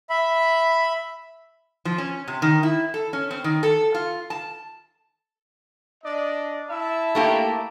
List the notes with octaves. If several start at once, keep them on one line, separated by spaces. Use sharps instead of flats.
E5 B5
F3
C#4
C3
D#3
E4
A4
C#4
C4
D#3
A4
F4
A5
D4 D5 D#5
E4 E5 A5
A3 A#3 G4